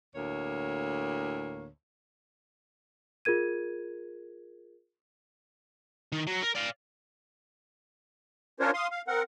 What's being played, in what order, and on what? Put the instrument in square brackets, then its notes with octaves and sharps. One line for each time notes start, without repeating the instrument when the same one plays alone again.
[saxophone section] D2 A2 A#3 C#5
[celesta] F4 G#4 A#4 G#6 D#7
[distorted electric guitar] D#3
F#3
A#4
D5 F5
[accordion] C#4 D4 F4 A#4 C5 C#5
F5 C6 D#6
F5
C4 A#4 F#5